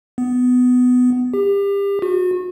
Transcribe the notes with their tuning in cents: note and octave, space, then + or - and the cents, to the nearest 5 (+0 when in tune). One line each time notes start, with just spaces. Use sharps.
B3 +15
G4 +30
F#4 -35